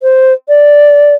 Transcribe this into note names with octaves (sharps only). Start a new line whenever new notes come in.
C5
D5